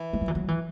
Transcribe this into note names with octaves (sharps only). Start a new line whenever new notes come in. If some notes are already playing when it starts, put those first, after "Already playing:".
Already playing: E3
G#3
F#3
E3
F#3
E3